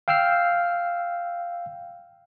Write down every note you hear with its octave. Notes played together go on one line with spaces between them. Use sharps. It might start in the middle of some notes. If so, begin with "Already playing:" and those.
F5 G5 E6 F6 C7